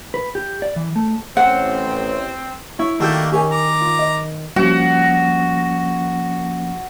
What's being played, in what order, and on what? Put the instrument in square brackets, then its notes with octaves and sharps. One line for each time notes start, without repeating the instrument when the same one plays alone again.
[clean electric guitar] B4
G4
D5
E3
A3
[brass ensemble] A1 [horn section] C4 [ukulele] F#5
[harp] E4 [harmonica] C#5
[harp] D#3 E6 G6 [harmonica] A3 A#3 D4 [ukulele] F#4 G4
[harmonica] C#4 C#5 [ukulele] G4 A#4 G#5
[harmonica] A#5 D6
[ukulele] F4
D#5
[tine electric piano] F3 A#3 C#4 [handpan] G3 [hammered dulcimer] F#4